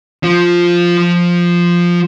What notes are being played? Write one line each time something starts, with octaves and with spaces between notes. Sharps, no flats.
F3 F4